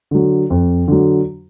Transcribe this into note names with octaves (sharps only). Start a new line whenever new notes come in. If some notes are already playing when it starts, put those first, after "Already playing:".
D3 F#3
F2
D3 F#3